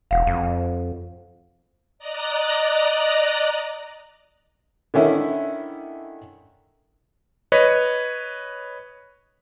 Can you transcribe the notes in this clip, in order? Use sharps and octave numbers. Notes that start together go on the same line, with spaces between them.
E1 F5 F#5
F2
D5 D#5 A#5 F#6 A#6
D3 D#3 C#4 E4
B4 C#5 D#5